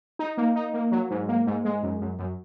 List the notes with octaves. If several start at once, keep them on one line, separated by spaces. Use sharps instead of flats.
D#4
A#3
D#4
A#3
F#3
G#2
A#3
G#2
G#3
F#2
F#2
F#2